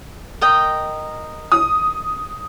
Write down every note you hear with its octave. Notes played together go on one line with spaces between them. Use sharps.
A#4 D#5 G5
D#6